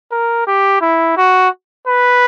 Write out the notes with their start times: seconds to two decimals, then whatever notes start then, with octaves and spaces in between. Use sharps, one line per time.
0.11 A#4
0.47 G4
0.81 E4
1.17 F#4
1.87 B4